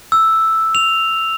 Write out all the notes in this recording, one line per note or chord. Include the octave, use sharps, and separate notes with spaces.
E6
F7